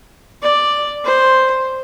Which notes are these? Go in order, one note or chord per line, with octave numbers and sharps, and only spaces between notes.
D5
C5